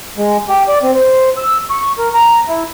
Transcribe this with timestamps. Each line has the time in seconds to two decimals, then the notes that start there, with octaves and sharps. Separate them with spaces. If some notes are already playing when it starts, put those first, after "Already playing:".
0.18 G#3
0.49 G4
0.68 D5
0.83 C4
0.95 C5
1.37 E6
1.70 C#6
1.98 A#4
2.14 A#5
2.48 E4